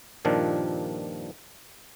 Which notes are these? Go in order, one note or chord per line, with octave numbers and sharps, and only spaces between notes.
G2 A#2 D#3 F3 D4